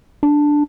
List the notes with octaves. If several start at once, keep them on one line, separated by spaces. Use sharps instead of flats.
D4